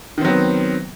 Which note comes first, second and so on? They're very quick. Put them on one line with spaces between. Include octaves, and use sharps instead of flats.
D#3 C4 F#3 B3